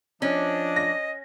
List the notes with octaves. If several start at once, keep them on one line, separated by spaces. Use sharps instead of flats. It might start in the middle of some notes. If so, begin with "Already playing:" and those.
F3 C#4 D4 D#5
A#6